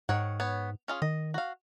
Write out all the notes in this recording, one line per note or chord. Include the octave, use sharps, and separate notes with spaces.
G#2 D#3 C#5 F#5
B3 C#5
C#4 F4 G#4
D#3 D#5
F#4 F5